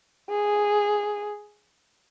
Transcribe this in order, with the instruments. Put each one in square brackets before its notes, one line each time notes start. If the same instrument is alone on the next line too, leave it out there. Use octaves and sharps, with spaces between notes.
[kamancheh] G#4